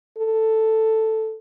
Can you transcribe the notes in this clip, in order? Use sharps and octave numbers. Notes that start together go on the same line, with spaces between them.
A4